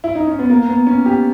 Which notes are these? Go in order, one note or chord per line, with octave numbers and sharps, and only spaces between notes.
E4
D#4
C#4
B3
A#3
B3
C#4
G4